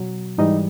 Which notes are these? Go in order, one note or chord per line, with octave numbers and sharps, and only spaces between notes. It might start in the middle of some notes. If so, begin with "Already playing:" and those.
Already playing: B2 F#3
G#2 E3 G3 D#4 D#5